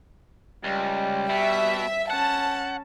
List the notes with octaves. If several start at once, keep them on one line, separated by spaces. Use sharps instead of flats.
C#2 G3
B2 E5
C#4 F#5 A5